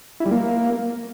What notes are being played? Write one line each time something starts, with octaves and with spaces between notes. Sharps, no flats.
E4
G3
A#3